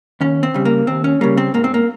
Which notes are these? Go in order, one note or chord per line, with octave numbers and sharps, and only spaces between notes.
D#2 C#4
C4
C#3 G3
A#3
D#2 C4
C#4
C#3 G3 A#3
C4
G#2 A#3
C4
A#3